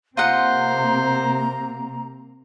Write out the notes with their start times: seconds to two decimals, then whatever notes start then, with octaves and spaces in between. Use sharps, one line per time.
0.17 C3 A#3 C4 F4 C5 D#5 F#5 A#5